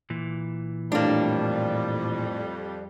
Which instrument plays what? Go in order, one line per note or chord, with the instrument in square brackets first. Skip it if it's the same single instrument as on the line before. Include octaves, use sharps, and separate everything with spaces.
[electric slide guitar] A#2 E3
[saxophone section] F2 G3 [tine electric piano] A2 [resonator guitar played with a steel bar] A#3 D4